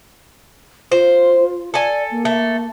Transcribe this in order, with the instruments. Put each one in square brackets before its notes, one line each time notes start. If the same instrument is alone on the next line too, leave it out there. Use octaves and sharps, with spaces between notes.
[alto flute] F4 [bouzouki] C5
[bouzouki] A4 G#5 [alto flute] D5
[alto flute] A#3
[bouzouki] A3